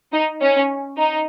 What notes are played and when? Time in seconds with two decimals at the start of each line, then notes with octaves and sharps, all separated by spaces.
0.13 D#4
0.41 C#4
0.98 D#4